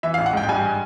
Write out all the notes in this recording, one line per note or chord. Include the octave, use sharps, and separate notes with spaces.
E3 E5
A1 F5
F#5
G#2 G5
G5
G2 G#5